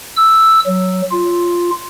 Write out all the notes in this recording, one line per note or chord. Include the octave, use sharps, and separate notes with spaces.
E6
F#3
F4